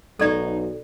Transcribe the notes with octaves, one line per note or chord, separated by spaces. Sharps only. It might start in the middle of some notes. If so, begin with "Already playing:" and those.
B1 D#4 F#4 A4 D5